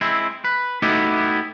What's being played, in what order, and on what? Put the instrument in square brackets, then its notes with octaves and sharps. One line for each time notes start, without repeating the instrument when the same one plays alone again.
[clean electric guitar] G#3 C4 E4
B4
A3 B3 D#4 E4 F#4 G4